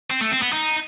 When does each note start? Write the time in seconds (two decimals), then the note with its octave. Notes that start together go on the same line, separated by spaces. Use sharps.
0.10 C4
0.21 A3
0.32 C4
0.42 B3
0.53 D#4